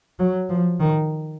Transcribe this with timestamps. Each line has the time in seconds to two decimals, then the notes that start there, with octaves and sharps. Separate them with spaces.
0.19 F#3
0.49 F3
0.80 D#3